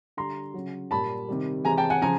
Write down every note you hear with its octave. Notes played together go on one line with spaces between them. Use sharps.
D3 G3 A#5 C6
C#3 F#3
A#2 G3 A5 B5
C3 D#3 G3
C3 E3 G#3 G#5 A#5
G5 A5
F#5 G#5
C#3 F3 G#5 A#5